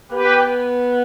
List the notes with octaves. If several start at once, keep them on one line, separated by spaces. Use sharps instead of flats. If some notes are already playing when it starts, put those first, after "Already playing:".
B3 G4 B4